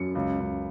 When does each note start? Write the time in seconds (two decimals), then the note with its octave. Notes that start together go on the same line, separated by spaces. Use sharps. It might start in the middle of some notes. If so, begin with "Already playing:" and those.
Already playing: F#2 C#7
0.15 C#2
0.40 C#2